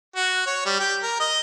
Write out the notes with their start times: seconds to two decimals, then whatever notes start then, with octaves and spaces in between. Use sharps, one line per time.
0.16 F#4
0.47 C#5
0.66 G3
0.80 G4
1.03 A#4
1.20 D#5